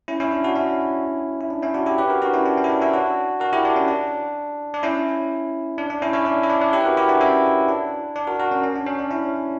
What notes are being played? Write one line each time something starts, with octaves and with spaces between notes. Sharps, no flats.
C#4 E4
C#4 E4
D4
D4 F#4
C#4 E4
E4
D4
C#4 E4
D4 F#4
E4 G4
G4 B4
F#4 A#4
D4 F#4
C#4 E4
D4
C#4
E4
D4
C#4 E4
D4 F#4
F#4 A#4
E4 G4
D4
C#4
D4
D4
C#4 E4
D4
D4
C#4 E4
C#4 E4
D4
E4
D4
D4
E4 G4
B4
F#4 A#4
E4 G4
D4 F#4
C#4 E4
D4
D4
F#4 A#4
F#4 A#4
C#4
C#4
D4
C#4
D4
C#4 E4